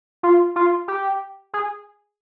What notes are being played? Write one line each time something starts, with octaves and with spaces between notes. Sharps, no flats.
F4
F4
G4
G#4